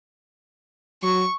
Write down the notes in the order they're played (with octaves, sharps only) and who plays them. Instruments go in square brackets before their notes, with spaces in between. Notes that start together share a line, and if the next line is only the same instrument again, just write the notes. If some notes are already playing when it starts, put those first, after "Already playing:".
[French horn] F#3 [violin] C#6